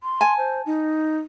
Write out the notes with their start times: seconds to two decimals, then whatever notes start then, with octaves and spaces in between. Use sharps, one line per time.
0.03 C6
0.21 G#5 A5
0.38 C5
0.66 D#4